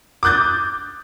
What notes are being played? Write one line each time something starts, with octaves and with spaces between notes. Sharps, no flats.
D6 D#6 F#6 G6 A6